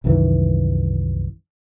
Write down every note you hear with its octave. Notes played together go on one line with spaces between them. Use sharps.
C2 F#2 D#3 E3